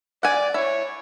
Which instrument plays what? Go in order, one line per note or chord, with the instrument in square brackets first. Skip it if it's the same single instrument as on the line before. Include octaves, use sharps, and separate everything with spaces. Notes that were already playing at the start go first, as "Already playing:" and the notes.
[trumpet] D5 [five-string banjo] F#5 G#5
[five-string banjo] E4 [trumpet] C#5